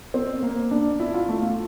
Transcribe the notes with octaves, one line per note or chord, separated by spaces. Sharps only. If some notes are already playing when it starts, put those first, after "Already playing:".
C4
A#3
D4
E4
F4
A3
F4